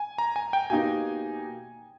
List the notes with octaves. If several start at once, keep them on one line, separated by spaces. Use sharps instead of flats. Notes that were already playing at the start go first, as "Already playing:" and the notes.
Already playing: G#5
A#5
G#5
G5
B2 A#3 D#4 G4 G#5